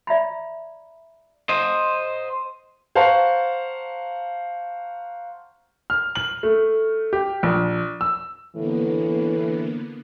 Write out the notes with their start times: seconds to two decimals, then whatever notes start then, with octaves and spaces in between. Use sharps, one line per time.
0.07 D5 E5 A#5 B5
1.49 C5 D#5
2.95 C5 F5 F#5 A5 A#5 C#6
5.90 F6
6.15 F#7
6.43 A3
7.13 G4
7.43 A#1
8.01 E6
8.55 A2 D3 E3 A#3 B3